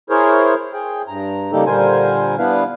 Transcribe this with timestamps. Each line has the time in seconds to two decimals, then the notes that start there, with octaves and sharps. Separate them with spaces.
0.10 E4 G#4 A#4 C5 C#5
0.73 G#4 G5
1.08 G2 A#5
1.52 C#3 G3 A#3 D#4 G4 A4
1.66 A#2 D3 G3 A#4 C5 G#5
2.38 G3 B3 D4 E4 B4 F5